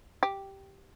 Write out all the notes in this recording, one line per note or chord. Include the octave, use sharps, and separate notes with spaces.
G4